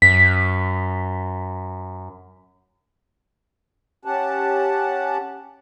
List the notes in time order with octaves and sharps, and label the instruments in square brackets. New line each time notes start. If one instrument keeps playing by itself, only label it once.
[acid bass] F#2 [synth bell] B6
[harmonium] C#4 G4 F#5 A5